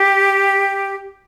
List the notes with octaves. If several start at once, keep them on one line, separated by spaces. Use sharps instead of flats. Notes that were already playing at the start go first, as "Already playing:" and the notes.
Already playing: G4